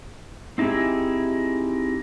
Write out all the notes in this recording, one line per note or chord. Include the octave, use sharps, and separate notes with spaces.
C4 D#4 E4 G4 G#4